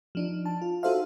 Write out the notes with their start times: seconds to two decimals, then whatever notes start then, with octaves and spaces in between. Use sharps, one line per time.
0.15 F3 D4 D#4
0.46 A5
0.62 F4
0.83 D#4 F#4 A4 C5 E5 F5